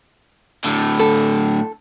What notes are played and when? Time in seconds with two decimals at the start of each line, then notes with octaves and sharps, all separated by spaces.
0.64 A2 D3
0.99 A4